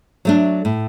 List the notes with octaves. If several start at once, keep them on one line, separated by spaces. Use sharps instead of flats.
F#3 A3 D4
A2